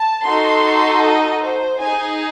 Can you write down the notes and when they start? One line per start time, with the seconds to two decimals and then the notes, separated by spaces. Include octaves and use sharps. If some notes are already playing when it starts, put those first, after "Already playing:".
Already playing: A5
0.26 D#4 F#4 A4 C6
1.04 D#5
1.42 C5
1.81 D#4 G#4 G#5